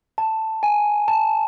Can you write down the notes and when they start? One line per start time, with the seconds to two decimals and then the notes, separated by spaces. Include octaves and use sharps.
0.18 A5
0.63 G#5
1.08 A5